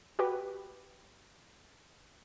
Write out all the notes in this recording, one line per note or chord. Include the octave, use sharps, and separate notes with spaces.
F#4 G4 B4